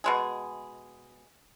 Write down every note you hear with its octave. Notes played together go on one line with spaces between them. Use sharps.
B2 G#3 G#4